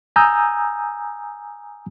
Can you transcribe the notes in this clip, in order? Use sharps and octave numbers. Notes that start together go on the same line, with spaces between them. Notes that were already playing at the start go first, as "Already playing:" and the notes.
G#5 A#5 D#6 E6 G6